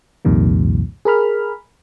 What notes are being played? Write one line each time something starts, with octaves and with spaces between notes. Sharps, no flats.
C2 F2 A#2 D#3 G3
G#4 A#4 B5 F6